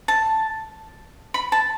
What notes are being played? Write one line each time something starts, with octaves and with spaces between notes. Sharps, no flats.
A5
B5
A5